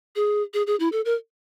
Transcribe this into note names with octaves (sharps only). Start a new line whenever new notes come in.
G#4
G#4
G#4
E4
A4
A#4